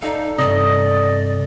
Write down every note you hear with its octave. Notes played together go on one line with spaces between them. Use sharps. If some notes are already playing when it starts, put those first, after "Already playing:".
D#4 A4 D5 D#5 F5
G2 C3 D5 D#5